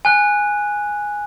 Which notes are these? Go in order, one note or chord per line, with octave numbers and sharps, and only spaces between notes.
G#5 F#6